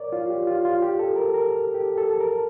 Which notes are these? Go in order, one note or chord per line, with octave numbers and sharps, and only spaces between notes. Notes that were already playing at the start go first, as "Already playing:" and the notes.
Already playing: A#4 C#5 D5
F4
G4
F4
F4
G4
A4
A#4
A#4
A4
G4
A4
A4
A#4